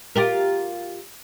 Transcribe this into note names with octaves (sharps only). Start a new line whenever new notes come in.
F4 G4 A#4